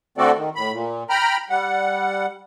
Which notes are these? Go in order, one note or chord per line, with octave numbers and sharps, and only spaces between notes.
D3 A3 C4 F#4 A4 D5
D#3
A2 B5
A#2
G5 A#5 B5 F6
G3 F#5